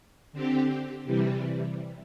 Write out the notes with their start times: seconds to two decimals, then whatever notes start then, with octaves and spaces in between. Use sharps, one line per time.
0.32 D3 C4 G4
1.05 C3 E3 G3